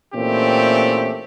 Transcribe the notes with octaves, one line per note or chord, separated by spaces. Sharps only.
A#2 E3 A3 C4 C#4 G4